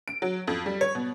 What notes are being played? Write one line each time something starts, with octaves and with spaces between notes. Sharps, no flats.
D7
F#3
F2
G3
C#5
B2